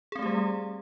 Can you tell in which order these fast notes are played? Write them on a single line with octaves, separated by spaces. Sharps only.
G#4 C4 A3 G4 G3